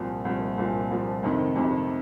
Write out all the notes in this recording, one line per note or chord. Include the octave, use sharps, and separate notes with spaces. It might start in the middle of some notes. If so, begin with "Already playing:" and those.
Already playing: C2 A#2 F3
C2 A#2 F3
C2 A#2 F3
C2 A#2 F3
F2 C3 D#3
F2 C3 D#3